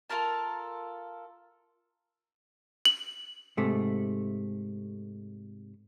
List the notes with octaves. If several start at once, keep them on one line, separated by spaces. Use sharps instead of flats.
F4 A4 A#4 A5
F#7
G#2 C3 A3